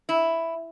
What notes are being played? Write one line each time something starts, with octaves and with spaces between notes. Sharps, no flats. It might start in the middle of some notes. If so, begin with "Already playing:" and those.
E4